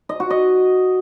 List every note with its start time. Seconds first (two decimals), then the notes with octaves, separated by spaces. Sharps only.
0.09 D#5
0.20 F#4
0.30 D#5